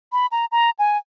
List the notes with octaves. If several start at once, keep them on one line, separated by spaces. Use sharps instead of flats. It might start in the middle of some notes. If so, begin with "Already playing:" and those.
B5
A#5
A#5
G#5